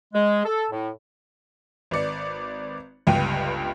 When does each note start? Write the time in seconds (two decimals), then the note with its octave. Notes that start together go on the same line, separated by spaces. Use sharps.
0.14 G#3
0.45 A4
0.71 A2
1.91 G#1 B4 D5 C#7
3.07 G1 C#2 G2 G4 G5 D#7